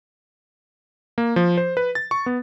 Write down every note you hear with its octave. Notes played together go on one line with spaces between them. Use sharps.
A#3
F3
C5
B4
A6
C#6
B3